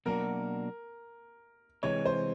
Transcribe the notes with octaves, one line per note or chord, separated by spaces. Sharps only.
B2 F#3 A#3 D4 F#4 A#4
C3 E3 G#3 C#5
C5